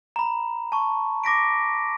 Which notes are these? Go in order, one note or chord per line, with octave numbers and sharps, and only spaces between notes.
A#5 B5
A5 C#6
D6 A#6 B6 D7